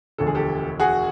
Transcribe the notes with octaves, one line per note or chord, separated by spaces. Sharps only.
E1 D2 D3 F3 A4
G#4
G4 A4
F#4 G#4